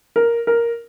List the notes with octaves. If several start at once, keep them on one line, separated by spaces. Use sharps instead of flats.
A#4
A#4